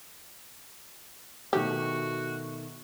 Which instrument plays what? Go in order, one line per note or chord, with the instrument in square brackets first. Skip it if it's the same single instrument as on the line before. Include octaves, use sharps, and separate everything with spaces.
[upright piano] B2 D#3 A3 [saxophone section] F#4 [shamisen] G4